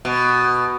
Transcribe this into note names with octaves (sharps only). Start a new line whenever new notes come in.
B2